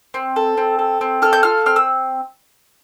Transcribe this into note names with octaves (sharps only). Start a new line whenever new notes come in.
C4
A4
C4
A4
C4
A4 F6
G6
F4 F6
C4 F6
E6